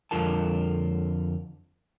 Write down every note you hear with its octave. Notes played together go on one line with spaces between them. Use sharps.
F2 D3 F4 A#4 A5